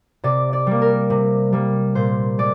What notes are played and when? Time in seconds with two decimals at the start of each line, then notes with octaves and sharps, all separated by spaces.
0.24 C3 D5
0.53 D5
0.67 G3 A#3
0.82 A#4
1.10 C3
1.52 G3 A#3
1.95 A#2 C5
2.38 G#3 D5